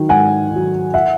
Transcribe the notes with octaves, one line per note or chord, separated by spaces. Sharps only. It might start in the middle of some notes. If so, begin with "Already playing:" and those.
Already playing: D#3 F#3
G#2 F#5 G#5
D#3 F#3
E5 F#5